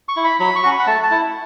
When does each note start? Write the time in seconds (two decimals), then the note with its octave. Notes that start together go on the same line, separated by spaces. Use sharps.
0.09 C#6
0.16 E4
0.24 B5
0.40 F#3 B5
0.56 C#6
0.63 C#4 F#4
0.71 B5
0.79 F#5
0.87 A3 A5
1.03 A5
1.11 E4